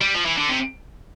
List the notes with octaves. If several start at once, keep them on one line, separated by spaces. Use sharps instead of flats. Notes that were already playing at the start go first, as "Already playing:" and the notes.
G3
F3
E3
D3
C3